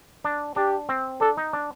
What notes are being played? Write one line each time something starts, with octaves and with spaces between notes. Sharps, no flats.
D4
D4 G4
C4
D4 A4
D#4
D4